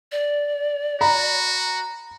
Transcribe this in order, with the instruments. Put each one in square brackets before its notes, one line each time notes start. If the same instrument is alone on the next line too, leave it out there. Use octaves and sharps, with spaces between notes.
[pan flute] D5
[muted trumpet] F#4 [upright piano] A#5 B5